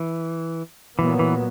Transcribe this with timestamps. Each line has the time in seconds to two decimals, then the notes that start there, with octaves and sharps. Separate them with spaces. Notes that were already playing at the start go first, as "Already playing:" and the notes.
Already playing: E3
0.99 A#2 E3 F#3 B3
1.19 E3